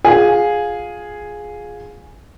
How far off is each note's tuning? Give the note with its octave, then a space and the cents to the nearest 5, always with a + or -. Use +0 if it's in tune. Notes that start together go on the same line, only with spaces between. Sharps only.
F4 +20 G#4 +0